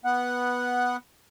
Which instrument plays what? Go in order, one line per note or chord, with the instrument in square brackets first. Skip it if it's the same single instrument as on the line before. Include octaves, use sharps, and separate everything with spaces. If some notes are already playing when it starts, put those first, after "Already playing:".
[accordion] B3 F#5